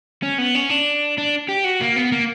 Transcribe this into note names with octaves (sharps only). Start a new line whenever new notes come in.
C#4
B3
C#4
D4
D4
G4
F#4
A#3
B3
A#3